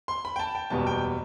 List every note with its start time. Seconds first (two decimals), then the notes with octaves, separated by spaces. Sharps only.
0.08 C6
0.25 B5
0.36 G5
0.40 A5
0.55 G5
0.70 F#1 E2 B2 G3 B3 A5
0.87 G5